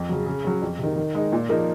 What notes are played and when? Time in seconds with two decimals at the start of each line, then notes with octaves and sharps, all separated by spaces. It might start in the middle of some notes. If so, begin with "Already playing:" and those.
Already playing: F2
0.09 C#3 F#3
0.26 C#3
0.44 F#3 C#4
0.62 F2
0.79 C3 D#3
0.96 D#3
1.15 G#3 D#4
1.32 A#2
1.49 F3 A#3 D#4 A#4